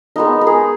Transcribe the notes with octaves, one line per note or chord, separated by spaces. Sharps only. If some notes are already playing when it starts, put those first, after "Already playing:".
G#3 B3 D#4 A#4
A#4
G#4